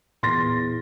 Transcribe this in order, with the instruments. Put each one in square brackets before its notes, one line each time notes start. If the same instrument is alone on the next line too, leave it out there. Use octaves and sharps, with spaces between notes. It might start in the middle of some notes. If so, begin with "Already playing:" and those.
[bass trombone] E2 [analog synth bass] A#2 [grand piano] C6 A6 A#6